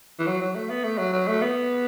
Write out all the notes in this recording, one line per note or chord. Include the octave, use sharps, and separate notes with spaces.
E3
F#3
F#3
A3
B3
A3
F#3
F#3
A3
B3